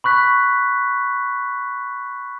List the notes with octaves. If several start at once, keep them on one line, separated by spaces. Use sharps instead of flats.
B5 C#6 F#6 B6